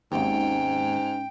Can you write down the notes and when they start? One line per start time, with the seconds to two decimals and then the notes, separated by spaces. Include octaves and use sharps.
0.12 G#1 D#2 G#2 C#4 G5